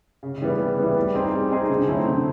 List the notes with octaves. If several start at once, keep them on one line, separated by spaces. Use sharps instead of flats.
C#3
E3 G3 B3
C#3
E3 G3 B3
G3
C4 D#4 G#4
G3
C4 D#4 G#4
D3
F#3 A3 C4 E4
D3